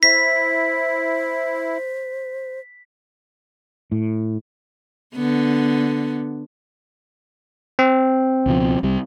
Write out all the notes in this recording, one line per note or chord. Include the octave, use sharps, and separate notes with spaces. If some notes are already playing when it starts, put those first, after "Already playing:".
E4 C5 B6
A2
D3 B3
C4
C#2 B2 F3
C2 C3 G3